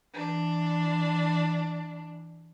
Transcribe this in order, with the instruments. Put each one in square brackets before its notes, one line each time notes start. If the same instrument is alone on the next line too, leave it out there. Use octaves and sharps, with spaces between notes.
[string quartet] E3 D4